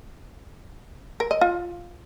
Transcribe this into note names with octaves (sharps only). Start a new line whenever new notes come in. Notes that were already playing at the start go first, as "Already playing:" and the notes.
A#4
D#5
F4